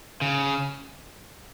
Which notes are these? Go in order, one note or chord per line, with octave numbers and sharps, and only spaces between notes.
C#3